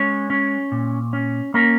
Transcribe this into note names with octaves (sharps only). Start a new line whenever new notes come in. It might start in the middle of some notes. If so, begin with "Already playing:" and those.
Already playing: G#3 C#4 C#5
C#4
A#2
C#4
A#3 C#4 A#4